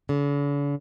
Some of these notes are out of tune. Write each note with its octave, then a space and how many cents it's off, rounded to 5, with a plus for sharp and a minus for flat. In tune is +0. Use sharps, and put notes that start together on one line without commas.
D3 -45